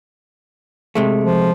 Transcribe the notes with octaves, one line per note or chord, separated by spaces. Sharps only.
C3 G#3 A3
F3